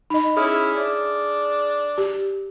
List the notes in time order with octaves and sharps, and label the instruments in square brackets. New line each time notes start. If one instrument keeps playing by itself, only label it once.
[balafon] D#4 D#5 [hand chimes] B5
[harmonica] C#4 E4 [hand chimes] G#4 D#6 F6
[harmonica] D4
[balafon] G4